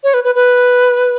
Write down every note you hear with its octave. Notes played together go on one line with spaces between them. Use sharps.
C#5
B4
B4
B4